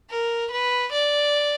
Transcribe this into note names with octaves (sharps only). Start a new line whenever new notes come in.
A#4
B4
D5